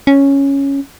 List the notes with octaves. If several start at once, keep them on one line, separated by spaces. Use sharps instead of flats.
C#4